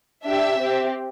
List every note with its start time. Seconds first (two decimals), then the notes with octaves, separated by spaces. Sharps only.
0.25 D4 G4 E5
0.59 C4 G4